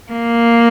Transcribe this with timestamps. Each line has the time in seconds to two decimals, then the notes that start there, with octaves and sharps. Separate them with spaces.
0.12 A#3